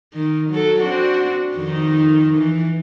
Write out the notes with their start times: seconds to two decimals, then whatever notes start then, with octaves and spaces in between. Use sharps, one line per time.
0.13 D#3
0.50 F#3 A4
0.80 C4 D4 F#4
1.56 F2 D#3 D#4
2.38 E3